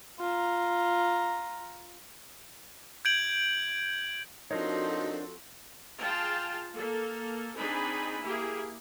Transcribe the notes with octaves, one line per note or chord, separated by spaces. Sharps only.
F4 A#5
G6 G#6 D7 F#7
F3 C4 D4 D#4 F#4 A4 A#4 C#5
F4 G#4 F5 G5 A5
A#3 A4
C4 D4 D#4 G#4 G#5 B5
A#3 E4 G4 G#4